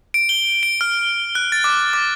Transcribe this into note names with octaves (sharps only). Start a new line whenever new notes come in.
D7
G7
D7
F6
F#6
A6
D6
D6